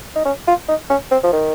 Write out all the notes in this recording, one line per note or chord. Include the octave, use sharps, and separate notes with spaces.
D#4
C#4
F4
D#4
C#4
C4
F3
D#3